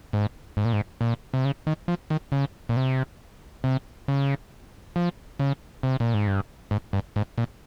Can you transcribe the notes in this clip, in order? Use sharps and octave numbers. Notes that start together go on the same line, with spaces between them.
G#2
G#2
A#2
G#2
A#2
C3
C#3
D#3
F3
D#3
C#3
A#2
C3
C3
C#3
F3
C#3
C3
A#2
G#2
G2
G#2
G2
G#2
A#2